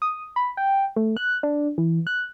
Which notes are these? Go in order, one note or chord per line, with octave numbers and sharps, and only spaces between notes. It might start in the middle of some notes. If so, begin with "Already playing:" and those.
D#6
B5
G5
A3
F#6
D4
E3
F#6